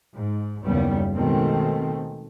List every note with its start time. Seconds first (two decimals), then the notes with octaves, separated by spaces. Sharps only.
0.14 G#2
0.65 F#1 D#2 C#3 G3 B3
1.15 B2 D#3 G#3 A3 C4